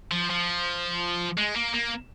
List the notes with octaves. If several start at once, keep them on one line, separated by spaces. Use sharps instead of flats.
F3
F3
G#3
A#3
A#3